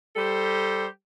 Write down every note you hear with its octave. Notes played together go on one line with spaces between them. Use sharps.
G3 G4 A4 C5